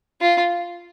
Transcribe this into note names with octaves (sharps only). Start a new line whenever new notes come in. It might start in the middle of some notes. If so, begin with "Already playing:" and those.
F4